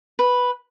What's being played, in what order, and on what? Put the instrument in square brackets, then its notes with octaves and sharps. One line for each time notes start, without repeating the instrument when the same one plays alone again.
[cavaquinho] B4